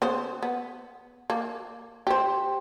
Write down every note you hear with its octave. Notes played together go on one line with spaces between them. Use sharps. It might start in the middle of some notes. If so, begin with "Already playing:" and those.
C#3 B3 C5
B3
A#3
G4 C5